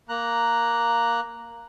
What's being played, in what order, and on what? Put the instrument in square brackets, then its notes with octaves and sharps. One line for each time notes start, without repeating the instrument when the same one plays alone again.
[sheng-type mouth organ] A#3 A#5 F#6